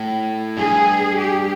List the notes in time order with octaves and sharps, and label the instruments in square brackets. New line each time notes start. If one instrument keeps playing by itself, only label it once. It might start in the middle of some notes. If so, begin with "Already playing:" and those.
Already playing: [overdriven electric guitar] A2
[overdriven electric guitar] G2 [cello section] G#4
[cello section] G4